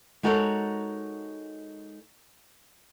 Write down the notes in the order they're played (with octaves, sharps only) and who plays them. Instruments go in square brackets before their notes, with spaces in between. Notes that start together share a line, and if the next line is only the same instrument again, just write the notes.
[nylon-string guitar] G#3 D#4 F#4 A4 A#4 C#5